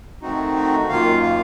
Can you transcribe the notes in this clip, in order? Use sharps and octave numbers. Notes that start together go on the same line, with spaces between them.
D#3 A3 C4 D#4 F#4
F#4
F#2 D#3 A#3 F4 F5
F5